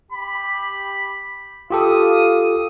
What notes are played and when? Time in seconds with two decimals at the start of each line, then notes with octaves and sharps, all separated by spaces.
0.11 G4 B5
1.70 F4 G4 A4 F5 D#6